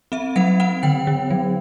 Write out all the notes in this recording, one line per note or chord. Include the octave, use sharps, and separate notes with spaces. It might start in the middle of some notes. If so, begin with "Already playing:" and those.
C4 E5
F#3 F#5
C4 F#5
D3 G5
D3
F#3